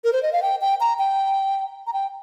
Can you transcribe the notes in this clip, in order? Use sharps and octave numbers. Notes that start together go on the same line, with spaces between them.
A#4
C5
D#5
F5
G5
G5
A#5
G5
A#5
G5